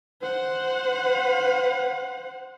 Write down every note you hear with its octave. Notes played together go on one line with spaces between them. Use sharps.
C5 F#5